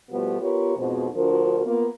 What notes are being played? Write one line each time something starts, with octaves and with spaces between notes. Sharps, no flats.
B2 F3 G3 A3 B3
B3 F4 G4 A#4 B4 C#5
F2 G#2 B2
D2 F3 D4 F#4 A#4
A#3 B3 F4